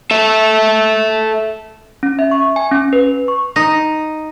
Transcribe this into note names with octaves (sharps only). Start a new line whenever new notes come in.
A4 E5
C#4
E5
C#6
G#5
C#4
B4
C#6
D#4